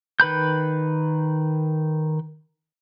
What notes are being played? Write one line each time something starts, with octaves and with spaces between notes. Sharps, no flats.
D#3 B4 B5 G6